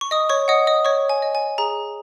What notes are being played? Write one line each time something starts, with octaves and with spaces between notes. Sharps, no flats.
C#6
D#5 D#6
C#5 C#6
D#5 F#5 D#6
D#5 D#6
C#5 D#5 C#6
G#5
D#5
G#5
G#4 A#5